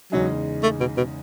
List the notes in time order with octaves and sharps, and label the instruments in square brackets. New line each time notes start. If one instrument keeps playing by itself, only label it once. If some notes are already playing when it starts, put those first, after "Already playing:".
[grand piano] E2 C#3 G#3 D#4 G#4 [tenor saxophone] F#3
[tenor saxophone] A3
B2
B2